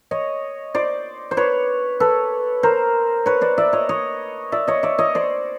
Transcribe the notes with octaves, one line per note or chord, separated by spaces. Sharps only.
C#5 D#5
C5 D5
C5
B4 C#5
A4 B4
A#4 C5
B4 C#5
C5 D5
D5 E5
C#5 D#5
C#5 D#5
D5 E5
C#5 D#5
D5 E5
C#5 D#5
C5 D5